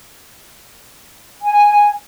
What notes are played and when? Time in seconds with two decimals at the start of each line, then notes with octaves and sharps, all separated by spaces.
1.42 G#5